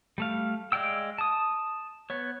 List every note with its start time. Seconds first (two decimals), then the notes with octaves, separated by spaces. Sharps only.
0.18 G3 A3 F5
0.72 G#3 D5 F5 G5 E6
1.18 A5 D#6
2.10 B3 C#5